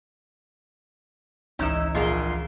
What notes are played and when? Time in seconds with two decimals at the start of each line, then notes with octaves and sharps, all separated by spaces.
1.59 G#1 C#2 E3 C#4 D#4 E4 E5
1.95 A#1 F4 G#4 A#4 C6